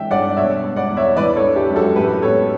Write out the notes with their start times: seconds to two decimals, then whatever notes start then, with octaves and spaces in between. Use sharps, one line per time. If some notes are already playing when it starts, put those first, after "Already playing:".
Already playing: E3 D4 E5 G5
0.11 G2 D5 F#5
0.37 B2 C#5 E5
0.63 B3
0.76 D5 F#5
0.90 E2
0.97 C#5 E5
1.17 E3 B4 D5
1.36 A4 C#5
1.43 D4
1.56 G4
1.70 F#2
1.76 F#4 A4
1.96 A2 G4 B4
2.22 B3 A4 C#5